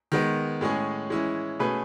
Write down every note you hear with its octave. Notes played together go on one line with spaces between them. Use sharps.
D#3 G#3 B3
A2 G#3 C#4 G#4
E3 G#3 C#4 E4
B2 A3 C#4 G#4 B4